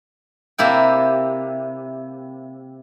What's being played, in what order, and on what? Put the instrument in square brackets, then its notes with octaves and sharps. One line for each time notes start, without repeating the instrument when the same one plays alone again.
[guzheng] C3 A#3 E4 G5